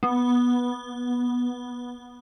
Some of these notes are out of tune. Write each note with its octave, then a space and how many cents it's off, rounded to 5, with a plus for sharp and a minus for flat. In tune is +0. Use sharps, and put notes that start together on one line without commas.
B3 -10